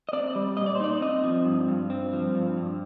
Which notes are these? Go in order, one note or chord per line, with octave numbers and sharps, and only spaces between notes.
D#5
C4 D5
G3
A#2 D#5
D5
C5
D#4 D5
C4 D#5
F3
G2
G2
C4
F3
G2
G2